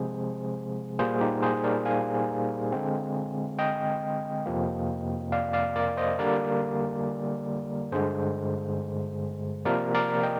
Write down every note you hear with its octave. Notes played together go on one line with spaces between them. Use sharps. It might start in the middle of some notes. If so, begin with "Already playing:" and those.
Already playing: C3 F3 G#3 C4 G#4 C5
A#2 G3 A#3 G#4 C5
D#4 G4
G#4 C5
A#4 D5
F5 G#5
D3 G#3 C4
D#5 G5
F2 C3 F3 A#3
D5 F5
D5 F5
A#4 D5
C5 D#5
D3 G3 A#3 A#4 D5
G2 D3 G#3 G#4 C5
C3 F3 A#3 A#4 D5
A#4 D5
D#5 G5